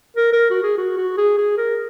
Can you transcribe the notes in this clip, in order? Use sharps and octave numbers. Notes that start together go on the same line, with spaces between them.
A#4
A#4
F#4
G#4
F#4
F#4
G#4
G#4
A#4